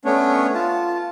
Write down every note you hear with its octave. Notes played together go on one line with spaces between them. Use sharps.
A3 B3 C#4 D4 C#5
F4 A5